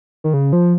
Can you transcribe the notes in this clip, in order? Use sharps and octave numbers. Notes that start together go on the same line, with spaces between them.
D#3
C#3
F3